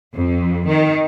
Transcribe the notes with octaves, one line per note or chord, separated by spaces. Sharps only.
F2
D#3